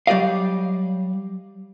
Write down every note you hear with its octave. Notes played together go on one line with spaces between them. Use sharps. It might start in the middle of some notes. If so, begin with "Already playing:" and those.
F#3 G3 G4 D5 D#5 F5